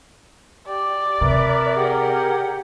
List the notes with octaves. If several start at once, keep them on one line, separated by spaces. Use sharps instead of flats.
G4 D5
C3 A#4 B4 E5
G4 G#4 F#5